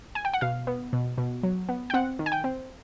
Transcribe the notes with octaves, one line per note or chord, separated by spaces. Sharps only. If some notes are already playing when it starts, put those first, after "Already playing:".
G#5
G5
F#5
B2 F5
B3
B2
B2
F#3
B3
G5
C4 F#5
D#3
G#5
G5
C4